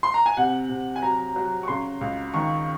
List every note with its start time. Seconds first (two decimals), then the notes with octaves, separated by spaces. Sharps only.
0.03 C6
0.14 A#5
0.26 G#5
0.37 C3 F#5
0.69 C3
0.96 G#5
1.02 F#3 A#5
1.36 F#3
1.63 C#6
1.68 C#3 C6
2.01 C#2
2.34 D#3 C#6